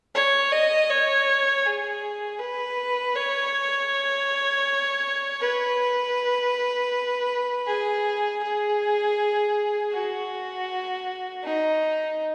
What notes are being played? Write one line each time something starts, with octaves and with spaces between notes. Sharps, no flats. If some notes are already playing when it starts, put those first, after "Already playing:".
C#5
D#5
C#5
G#4
B4
C#5
B4
G#4
G#4
F#4
D#4